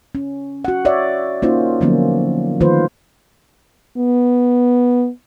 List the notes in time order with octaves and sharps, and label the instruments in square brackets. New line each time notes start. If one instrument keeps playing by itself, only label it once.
[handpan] C#4
F#4 F#5
C#5 D5 E5
A#3 C#4 D#4 F4 C5
D3 F3 F#3 A#3 B3 C#4
D#3 F3 A3 F4 B4 C5
[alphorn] B3